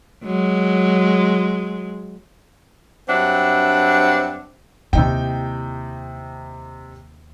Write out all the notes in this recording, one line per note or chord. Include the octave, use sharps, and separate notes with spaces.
F#3 G#3
G2 F#3 C4 D4 E5 F#5
D#2 C3 D#4 E4 G5